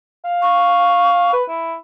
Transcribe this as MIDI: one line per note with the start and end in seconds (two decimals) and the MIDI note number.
0.25 1.28 77
0.42 1.37 85
1.33 1.43 71
1.48 1.75 64